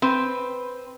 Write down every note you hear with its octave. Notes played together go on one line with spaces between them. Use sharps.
C4 B4